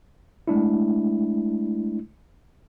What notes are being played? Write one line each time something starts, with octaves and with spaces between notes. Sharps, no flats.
G#3 A3 D4 E4